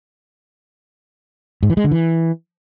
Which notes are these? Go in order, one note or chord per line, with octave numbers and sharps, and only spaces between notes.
G#2
E3
G#3
D3
E3